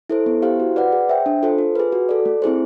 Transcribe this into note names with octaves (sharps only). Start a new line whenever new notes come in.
E4 A4 C5
B3
E4 G4 C5 F5
F#4
B4 D5 F#5
G#4
C5 E5 G5
D4
F4 A4 C5
F4
G#4 B4
F#4
A4 D5
A3
C4 E4 G#4 C5